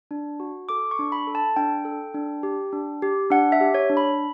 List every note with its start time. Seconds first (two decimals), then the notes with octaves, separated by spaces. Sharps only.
0.11 D4
0.40 F#4
0.69 A4 D6
0.91 C#6
0.99 D4
1.12 B5
1.27 A4
1.35 A5
1.56 D4 G5
1.85 A4
2.14 D4
2.43 G4
2.73 D4
3.02 G4
3.30 D4 F#5
3.52 E5
3.61 G4
3.74 C#5
3.90 D4
3.97 B5